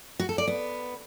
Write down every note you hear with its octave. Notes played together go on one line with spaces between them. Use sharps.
F#4
A4
D5
B3